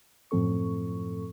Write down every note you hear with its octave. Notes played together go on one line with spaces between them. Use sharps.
F#2 A2 F3 C4 A4 C#6